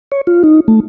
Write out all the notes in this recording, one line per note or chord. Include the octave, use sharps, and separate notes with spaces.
C#5
F4
D#4
A3